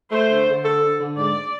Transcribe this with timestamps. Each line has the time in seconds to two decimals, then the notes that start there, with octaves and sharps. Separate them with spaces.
0.11 A3 C5
0.29 D3
0.47 D3
0.65 A4
0.82 D3
1.00 D3
1.18 G#2 D5